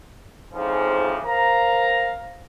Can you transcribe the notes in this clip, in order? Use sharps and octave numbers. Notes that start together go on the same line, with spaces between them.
F2 G#2 C#3 E3 F3
A#4 C5 F5 A#5